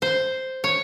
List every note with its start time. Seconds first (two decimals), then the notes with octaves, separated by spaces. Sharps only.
0.02 C5
0.64 C#5